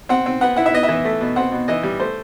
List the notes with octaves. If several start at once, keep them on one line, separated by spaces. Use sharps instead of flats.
C4 F#5
C4
B3 F#5
E4 F#5
E5
B3 D#5
E5
E3
A3
B2
C4 F#5
B2
E3 D#5
G3
A3 C5